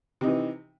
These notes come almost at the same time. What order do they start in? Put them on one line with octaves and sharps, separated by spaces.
C3 D#4 E3